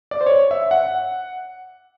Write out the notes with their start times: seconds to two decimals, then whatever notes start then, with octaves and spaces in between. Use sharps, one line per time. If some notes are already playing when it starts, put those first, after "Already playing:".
0.11 D5
0.21 C5
0.26 C#5
0.51 E5
0.71 F#5